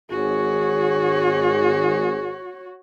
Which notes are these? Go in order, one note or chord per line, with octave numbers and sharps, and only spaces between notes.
G#1 F#4 G#4 C#5